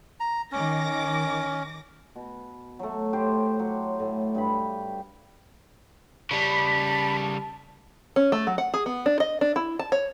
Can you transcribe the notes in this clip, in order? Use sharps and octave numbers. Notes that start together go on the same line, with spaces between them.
A#5
D#3 C#4 D6 A#6
B2
F#3 A3
A2 G4 C5 C6
F#3
A2
G2 G5 B5
C#3 G3 A5 B5
C#4
A3
F#3
F#5
G#4
B3
D4
D#5
D4
E4
A5
C#5